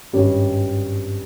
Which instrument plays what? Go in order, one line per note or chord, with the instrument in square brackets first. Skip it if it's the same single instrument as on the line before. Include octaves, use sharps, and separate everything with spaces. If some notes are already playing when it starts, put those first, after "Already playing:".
[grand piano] G#1 G2 G3 C#4 G4